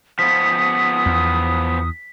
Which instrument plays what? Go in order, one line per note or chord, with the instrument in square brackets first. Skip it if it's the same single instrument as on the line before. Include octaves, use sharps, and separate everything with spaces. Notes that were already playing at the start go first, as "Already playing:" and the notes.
[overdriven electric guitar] F3 B3 [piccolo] D#6 [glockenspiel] B6
[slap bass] E2